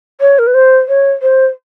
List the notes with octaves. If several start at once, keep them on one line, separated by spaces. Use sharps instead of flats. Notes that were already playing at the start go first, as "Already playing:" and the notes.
C#5
A#4
B4
C5
C#5
C5